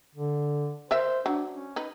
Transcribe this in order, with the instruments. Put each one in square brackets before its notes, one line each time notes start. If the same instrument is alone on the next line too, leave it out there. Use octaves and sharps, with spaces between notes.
[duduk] D3
[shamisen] A#4 D#5 E5 [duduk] C5
[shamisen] F#3 [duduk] D4
[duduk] C#4
[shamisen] D#4 B4